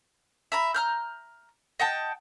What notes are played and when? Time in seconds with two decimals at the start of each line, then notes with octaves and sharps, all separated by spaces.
0.52 E5 A#5 B5
0.74 A#5 F6 G6
1.80 D#5 F#5 G5 A5